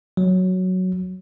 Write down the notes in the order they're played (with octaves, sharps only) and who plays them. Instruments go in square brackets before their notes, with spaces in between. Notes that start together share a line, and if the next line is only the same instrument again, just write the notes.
[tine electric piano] F#3